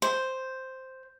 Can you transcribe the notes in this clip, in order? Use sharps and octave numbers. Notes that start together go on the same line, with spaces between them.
C5